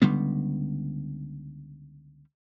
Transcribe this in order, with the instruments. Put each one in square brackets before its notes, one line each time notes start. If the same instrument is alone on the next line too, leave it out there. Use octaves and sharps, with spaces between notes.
[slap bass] C#2 D3 G3 B3